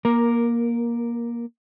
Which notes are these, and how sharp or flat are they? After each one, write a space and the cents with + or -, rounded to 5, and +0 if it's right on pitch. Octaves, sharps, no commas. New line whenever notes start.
A#3 +20 A#4 +0